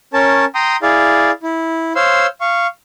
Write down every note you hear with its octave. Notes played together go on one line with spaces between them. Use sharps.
C#4 A#4 C#5 A5
G5 A#5 C6 D#6
E4 G#4 D5 F5
E4
C5 C#5 F5 C6 E6
F5 C#6